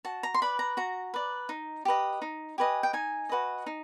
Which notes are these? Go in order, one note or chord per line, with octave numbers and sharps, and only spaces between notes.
F#4 A5
A#5
C6
B4 D5 B5
A#5
F#4 A#5
B4 D5
D#4
G4 B4 D#5
D#4
G4 B4 D#5 G#5
G5
D#4 G#5
F#4 B4 D#5
D#4